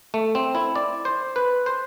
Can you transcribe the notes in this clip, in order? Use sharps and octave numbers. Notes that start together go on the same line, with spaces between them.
A3
C4
E4
D5
C5
B4
C5